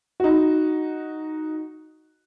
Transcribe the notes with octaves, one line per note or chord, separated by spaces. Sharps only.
D#4 F#4